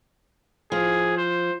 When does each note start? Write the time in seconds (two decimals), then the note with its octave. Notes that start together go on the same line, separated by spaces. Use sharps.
0.72 F3 G#4
1.17 C5